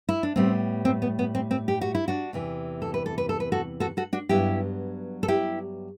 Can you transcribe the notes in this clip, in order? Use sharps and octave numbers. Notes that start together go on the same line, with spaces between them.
E4
D4
A2 G3 B3 C4
C4
B3
B3
C4
C4
G4
F#4
E4
D4 F#4
E2 C3 E3
A4
B4
A4
B4
A4
B4
F#4 A4
F#4 A4
F#4 A4
D4 F#4
G2 F#3 B3 E4 G4
A4
E4 G4